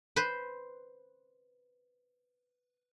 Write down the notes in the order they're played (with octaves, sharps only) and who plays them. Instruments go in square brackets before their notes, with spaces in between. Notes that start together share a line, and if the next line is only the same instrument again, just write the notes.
[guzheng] B4 C5